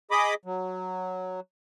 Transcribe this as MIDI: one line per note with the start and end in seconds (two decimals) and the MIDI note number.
0.11 0.34 68
0.11 0.34 75
0.11 0.34 83
0.11 0.34 86
0.11 0.34 87
0.45 1.40 54